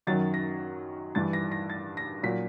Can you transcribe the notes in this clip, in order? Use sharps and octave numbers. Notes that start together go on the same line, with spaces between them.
F#2 D#3 F#3 A6
A#6
G2 E3 A6
A#6
A#6
A6
A#6
A#2 F#3 B6